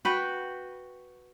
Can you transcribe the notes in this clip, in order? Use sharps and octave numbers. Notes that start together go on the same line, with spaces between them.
F#4 B4 G5